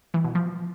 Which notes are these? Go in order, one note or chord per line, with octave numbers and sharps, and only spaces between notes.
E3
B2
F3